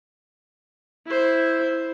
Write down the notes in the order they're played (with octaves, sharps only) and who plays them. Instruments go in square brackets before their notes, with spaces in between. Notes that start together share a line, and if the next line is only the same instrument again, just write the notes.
[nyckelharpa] E4 C5